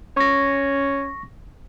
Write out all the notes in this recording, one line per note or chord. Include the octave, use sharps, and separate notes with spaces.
C#4 C#6 A#6